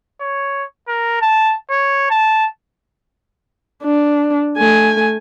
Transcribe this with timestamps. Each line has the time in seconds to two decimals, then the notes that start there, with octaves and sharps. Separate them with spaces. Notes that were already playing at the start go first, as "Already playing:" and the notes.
0.21 C#5
0.88 A#4
1.22 A5
1.70 C#5
2.11 A5
3.83 D4
4.58 A3 G#5